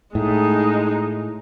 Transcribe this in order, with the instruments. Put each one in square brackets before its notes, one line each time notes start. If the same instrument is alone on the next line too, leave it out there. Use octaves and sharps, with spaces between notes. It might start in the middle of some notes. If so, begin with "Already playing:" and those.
[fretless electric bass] A2 [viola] G#3 D#4